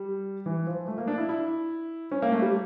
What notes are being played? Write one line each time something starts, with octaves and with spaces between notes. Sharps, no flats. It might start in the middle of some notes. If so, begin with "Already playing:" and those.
Already playing: G3
E3
F3
A3
A#3
D4
E4
E4
C#4
A#3
A3
G3